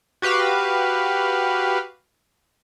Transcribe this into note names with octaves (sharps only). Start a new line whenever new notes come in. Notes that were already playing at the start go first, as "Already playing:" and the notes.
F#4 G4 B4 F5